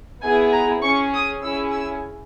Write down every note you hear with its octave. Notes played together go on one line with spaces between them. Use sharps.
B3 E4 G#4 G#5
A#5
C#4 G#4 C#6
D#6
C#4 E4 G#4 E6
E6